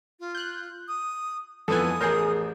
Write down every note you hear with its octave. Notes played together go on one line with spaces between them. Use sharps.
F4
F#6 G6
D#6
F2 E3 B3 A4 G#5 D#6
A1 G#4 A#4 G6 C7